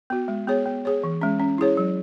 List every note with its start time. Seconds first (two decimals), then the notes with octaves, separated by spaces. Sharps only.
0.10 B3 F#4
0.28 G#3
0.48 B3 G#4 C#5
0.66 B3
0.85 G#4 C#5
1.04 E3
1.21 G#3 C#4
1.40 C#4
1.58 E4 G#4 C#5
1.77 F#3